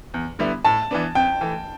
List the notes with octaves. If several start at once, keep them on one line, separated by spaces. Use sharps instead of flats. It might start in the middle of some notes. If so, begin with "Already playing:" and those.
E2
D3 G3 B3 E4
A2 A5
E3 B3 D4
F2 G5
E3 A3